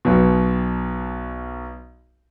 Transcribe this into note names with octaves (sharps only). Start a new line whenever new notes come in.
B1 B2